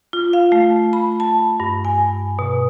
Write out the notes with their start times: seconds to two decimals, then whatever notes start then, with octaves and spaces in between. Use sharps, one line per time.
0.13 F4
0.33 F5
0.52 A3
0.93 B5
1.20 A5
1.60 G2
1.85 G#5
2.39 B2